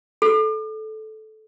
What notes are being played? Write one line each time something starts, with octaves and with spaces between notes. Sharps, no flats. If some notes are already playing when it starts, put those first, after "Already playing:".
A4